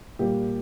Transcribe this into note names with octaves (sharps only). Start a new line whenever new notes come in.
A#2 G3 A#3 G4